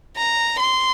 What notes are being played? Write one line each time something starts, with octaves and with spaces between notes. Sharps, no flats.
A#5
C6